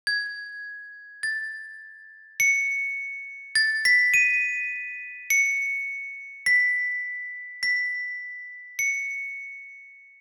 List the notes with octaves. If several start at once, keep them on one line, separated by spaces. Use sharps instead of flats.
G#6
A6
C#7
A6
B6
D#7
C#7
B6
B6
C#7